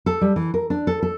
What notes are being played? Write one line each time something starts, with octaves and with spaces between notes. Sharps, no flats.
A4
G3
E3
A#4
D4
A4
A4